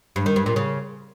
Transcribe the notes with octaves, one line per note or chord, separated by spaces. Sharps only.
G2
D#3
G2
A#2
C#3